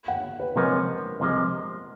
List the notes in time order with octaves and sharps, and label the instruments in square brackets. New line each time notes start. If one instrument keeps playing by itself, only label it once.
[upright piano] F#5
B4
[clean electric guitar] C3 F3 G#3 C#4 [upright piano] A#4
[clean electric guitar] C2 C3 F3 G#3